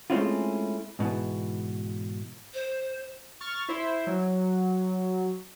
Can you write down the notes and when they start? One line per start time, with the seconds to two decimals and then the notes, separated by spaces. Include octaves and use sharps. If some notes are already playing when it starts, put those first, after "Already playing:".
0.10 G#3 A3 C4 C#4 E4 F4
0.99 G#2 B2 E3
2.54 C5
3.41 C#6 F6 A6
3.69 E4 C5 E5
4.07 F#3